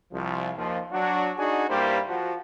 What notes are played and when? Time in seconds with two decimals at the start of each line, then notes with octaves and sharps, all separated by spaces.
0.12 C2 F3
0.57 D#2 F3
0.92 F#3 D4 F#4
1.37 D4 D#4 F#4 G#4
1.69 G2 G3 A#3 E4 G4 C5
2.07 F3 F#4